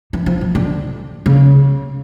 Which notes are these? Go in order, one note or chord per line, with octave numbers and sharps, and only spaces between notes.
E3
F3
E3
D3
C#3